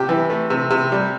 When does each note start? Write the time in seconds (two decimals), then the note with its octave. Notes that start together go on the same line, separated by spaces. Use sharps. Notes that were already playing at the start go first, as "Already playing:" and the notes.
Already playing: C3 G4 G5
0.09 E3
0.30 A3
0.50 C3
0.71 C3
0.92 G3